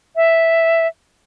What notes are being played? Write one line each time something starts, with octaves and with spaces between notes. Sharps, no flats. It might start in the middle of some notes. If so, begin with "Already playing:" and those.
E5